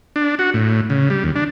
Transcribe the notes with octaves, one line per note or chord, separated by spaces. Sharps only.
D4
F#4
A2
C#3
G3
D#2
D4